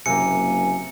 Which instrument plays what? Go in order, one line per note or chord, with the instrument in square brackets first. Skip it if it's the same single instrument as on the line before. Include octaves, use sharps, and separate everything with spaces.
[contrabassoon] F#1 [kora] C3 A#3 [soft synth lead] G#5 [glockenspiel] C#7